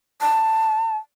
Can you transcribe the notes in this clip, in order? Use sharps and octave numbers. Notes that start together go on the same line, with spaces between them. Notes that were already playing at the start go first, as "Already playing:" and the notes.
A5